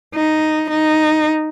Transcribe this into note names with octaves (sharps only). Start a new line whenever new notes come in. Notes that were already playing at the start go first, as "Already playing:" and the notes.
D#4
D#4